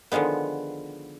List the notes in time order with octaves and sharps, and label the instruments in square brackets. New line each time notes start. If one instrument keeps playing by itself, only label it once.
[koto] D3 D#3 F3 G#3 B3